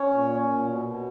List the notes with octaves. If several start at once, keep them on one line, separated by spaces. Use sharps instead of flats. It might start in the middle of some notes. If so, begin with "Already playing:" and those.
Already playing: C#4 C#5
A#2
C#4
A#2
B2
B2